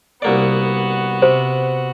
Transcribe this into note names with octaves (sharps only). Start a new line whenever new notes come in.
C2 A#3 B3 F#4 D5
C3 C5